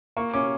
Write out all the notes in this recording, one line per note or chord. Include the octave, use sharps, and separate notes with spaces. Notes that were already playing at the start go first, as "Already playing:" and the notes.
A#3 C#6
C#4 D6